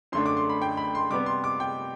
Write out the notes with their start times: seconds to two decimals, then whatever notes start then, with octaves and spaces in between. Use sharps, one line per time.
0.12 F#2 D3 A3 D4 C6
0.26 D6
0.37 C6
0.50 B5
0.62 G5
0.77 B5
0.95 C6
1.11 C3 G3 B3 D6
1.26 C6
1.44 D6
1.60 G5